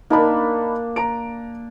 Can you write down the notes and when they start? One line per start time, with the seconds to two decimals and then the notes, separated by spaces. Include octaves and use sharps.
0.10 A#3 D4 D#4 A5 B5
0.96 A#5 D7